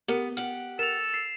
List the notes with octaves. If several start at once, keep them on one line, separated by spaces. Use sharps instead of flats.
B3 G4 A#4 C#7
G4 F#5 F6
A4 A#4 E7 F7
C7